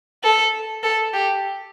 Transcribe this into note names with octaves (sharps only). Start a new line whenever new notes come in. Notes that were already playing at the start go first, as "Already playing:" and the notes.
A4
A4
G4